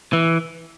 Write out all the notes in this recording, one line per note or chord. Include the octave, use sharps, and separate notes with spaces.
E3